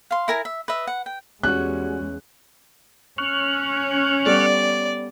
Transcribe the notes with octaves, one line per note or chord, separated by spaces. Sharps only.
F5 C6
E4 A#4 G#5 A#5
E5
B4 D#5 E5
F#5
G5
E2 G3 G#3 C#4 F#4 F#6
C#4 C#6 F6 F#6
G3 B3 A4 D5